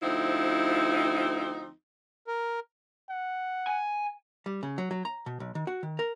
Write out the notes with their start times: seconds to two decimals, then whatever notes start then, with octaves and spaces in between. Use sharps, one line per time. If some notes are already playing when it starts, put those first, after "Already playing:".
0.02 D2 F3 C4 D#4 E4
2.27 A#4
3.09 F#5
3.67 G#5
4.46 G3
4.63 C#3
4.78 F#3
4.91 F#3
5.05 A#5
5.26 B2
5.40 B1
5.55 D#3
5.67 F#4
5.83 D#3
5.99 A#4